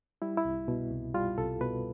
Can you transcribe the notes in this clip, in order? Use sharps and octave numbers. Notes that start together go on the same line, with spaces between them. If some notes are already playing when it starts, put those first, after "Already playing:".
G3 E4
E4
C2
B2
C2
G3 F4
C2 A4
B2 B4